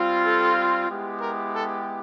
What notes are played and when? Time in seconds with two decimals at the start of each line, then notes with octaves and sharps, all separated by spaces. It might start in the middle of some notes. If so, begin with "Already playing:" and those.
Already playing: G3 C4 F4
0.24 A4
0.88 G#3 B3 E4 G4
1.21 A#4
1.53 A4